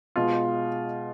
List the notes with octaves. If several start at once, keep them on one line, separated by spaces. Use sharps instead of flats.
B2 G#3 F4